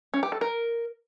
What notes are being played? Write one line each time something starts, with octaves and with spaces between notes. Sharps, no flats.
C#4
G4
A4
A#4